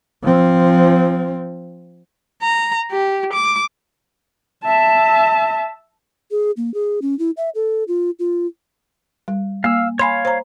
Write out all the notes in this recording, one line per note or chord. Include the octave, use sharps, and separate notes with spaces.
F3 C4
A#5
G4
D6
E5 A5
G#4
A#3
G#4
C#4
E4
E5
A4
F4
F4
G3
A#3 F5 E6
C#5 F5 G#5 B5 C6
C5 A#5